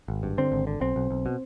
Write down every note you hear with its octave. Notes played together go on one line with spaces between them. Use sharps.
G#1
G2
D3 C4
G#1
D3
B1 C4
B1
B1
B2